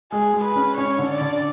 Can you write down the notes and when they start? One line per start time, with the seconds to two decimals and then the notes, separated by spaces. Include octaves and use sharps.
0.12 G#3 G#4
0.34 G#3
0.44 B4
0.55 C#4
0.78 C#4 C#5
0.99 D3
1.09 D5
1.21 D3